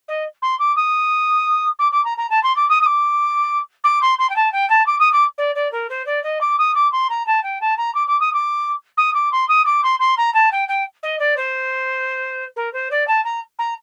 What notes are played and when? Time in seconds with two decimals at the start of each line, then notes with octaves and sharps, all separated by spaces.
0.08 D#5
0.42 C6
0.59 D6
0.76 D#6
1.79 D6
1.92 D6
2.05 A#5
2.18 A#5
2.30 A5
2.43 C6
2.56 D6
2.69 D#6
2.81 D#6
2.86 D6
3.84 D6
4.02 C6
4.19 C6
4.30 G5
4.36 A5
4.52 G5
4.70 A5
4.86 D6
5.00 D#6
5.13 D6
5.38 D5
5.55 D5
5.72 A#4
5.90 C5
6.06 D5
6.23 D#5
6.41 D6
6.58 D#6
6.75 D6
6.92 C6
7.10 A#5
7.27 A5
7.43 G5
7.61 A5
7.77 A#5
7.95 D6
8.07 D6
8.20 D#6
8.33 D6
8.97 D#6
9.14 D6
9.32 C6
9.49 D#6
9.66 D6
9.83 C6
10.00 C6
10.17 A#5
10.34 A5
10.52 G5
10.68 G5
11.03 D#5
11.19 D5
11.37 C5
12.56 A#4
12.73 C5
12.91 D5
13.08 A5
13.24 A#5
13.59 A#5